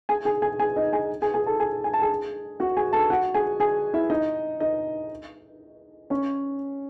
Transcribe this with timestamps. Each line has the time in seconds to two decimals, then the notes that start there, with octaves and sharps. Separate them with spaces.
0.09 G#4 G#5
0.25 G#4 G#5
0.42 G#4 G#5
0.60 G#4 G#5
0.76 D#4 D#5
0.93 G#4 G#5
1.22 G#4 G#5
1.34 G#4 G#5
1.46 A4 A5
1.60 G#4 G#5
1.84 G#5
1.93 A5
2.02 G#4 G#5
2.60 F#4 F#5
2.77 G#4 G#5
2.93 A4 A5
3.10 F#4 F#5
3.34 G#4 G#5
3.60 G#4 G#5
3.94 E4 E5
4.10 D#4 D#5
4.60 D#4 D#5
6.10 C#4 C#5